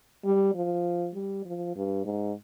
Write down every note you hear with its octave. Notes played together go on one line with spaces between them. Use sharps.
G3
F3
G3
F3
G2
G#2